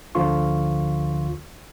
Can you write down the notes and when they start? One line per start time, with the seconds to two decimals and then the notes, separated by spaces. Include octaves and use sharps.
0.15 D2 D3 F3 F4 C6 C#6